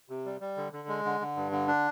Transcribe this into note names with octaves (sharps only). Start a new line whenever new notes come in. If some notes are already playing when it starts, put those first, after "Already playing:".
C3
G3
G3
D3
D3
G#3
D3
D3
G2
D3
D4